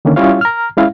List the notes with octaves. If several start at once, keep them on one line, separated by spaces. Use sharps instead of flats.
D3 D#3 A#3 C#4
G3 C#4 E4 F4 C#5 F5
A#5 F6
G#3 C#4 E4 F5